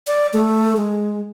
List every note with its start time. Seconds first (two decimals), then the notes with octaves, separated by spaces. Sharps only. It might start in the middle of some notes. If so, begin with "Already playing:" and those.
0.07 D5
0.33 A3
0.77 G#3